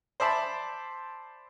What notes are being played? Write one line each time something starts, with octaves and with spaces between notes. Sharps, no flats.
C5 D5 E5 A5 B5